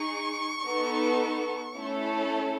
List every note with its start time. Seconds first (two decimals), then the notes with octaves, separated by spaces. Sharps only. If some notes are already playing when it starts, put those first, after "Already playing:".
Already playing: D#4 G#4 C#6
0.64 B3 D#4 A4
1.76 A3 C#4 E4 A4